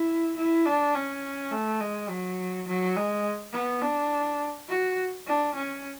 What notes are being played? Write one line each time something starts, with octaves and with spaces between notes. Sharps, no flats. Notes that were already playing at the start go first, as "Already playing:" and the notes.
Already playing: E4
E4
D4
C#4
A3
G#3
F#3
F#3
G#3
B3
D4
F#4
D4
C#4